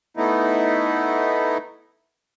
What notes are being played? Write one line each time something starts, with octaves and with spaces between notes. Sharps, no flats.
A3 B3 D#4 E4